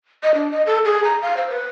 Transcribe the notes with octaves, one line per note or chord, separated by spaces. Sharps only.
D#5
D4
D#5
A4
G#4
A#5
F5
C5
B4